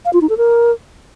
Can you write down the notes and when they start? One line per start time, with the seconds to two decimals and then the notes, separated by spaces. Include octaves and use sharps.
0.05 F5
0.13 F4
0.21 D#4
0.29 A4
0.37 A#4